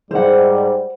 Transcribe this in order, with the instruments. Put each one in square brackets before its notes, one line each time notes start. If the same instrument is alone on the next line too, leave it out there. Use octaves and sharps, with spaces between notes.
[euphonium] G#2 [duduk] G3 [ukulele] C5 F#5